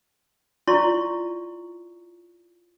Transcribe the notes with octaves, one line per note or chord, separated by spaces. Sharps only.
E4 F4 D5 A#5 C6 C#6